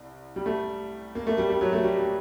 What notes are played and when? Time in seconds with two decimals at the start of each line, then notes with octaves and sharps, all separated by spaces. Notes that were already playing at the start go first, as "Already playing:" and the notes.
Already playing: C2
0.36 G3
0.46 A3
1.15 A#3
1.27 A3
1.38 G3
1.50 G3
1.61 F#3
1.73 A3
1.84 G3
2.00 G3